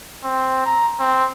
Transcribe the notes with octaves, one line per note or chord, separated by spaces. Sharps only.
C4
A#5
C4